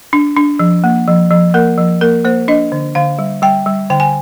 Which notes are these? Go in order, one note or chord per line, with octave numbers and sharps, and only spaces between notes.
D4
D4
F3
A#3
F3
F3
A#3 A#4
F3
A#3 A#4
A#3 C5
D4 D#5
D3
D3 F5
G3
G3 G5
G3
D3 G5
G#5